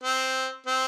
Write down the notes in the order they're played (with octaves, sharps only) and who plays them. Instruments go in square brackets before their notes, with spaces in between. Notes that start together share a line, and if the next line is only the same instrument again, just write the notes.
[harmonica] C4
C4